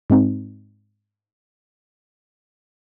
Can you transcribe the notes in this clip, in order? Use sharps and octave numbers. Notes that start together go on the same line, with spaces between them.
G#2 G#3 C4 D#4